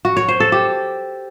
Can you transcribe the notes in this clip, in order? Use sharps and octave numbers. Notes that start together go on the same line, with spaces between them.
F#4
C#5
C5
A4
G4